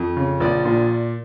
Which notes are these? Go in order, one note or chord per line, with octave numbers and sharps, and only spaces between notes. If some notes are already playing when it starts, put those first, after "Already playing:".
Already playing: F2
C#3
A#1 D5
A#2